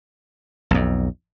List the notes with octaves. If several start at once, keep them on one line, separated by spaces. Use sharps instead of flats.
B1 F2